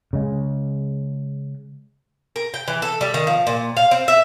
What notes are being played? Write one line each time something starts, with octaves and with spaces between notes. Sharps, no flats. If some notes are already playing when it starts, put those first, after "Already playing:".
C#3 G#3
A#4
G5
E3
A4
G3
D#3
F3
A#2
F5
C4
E5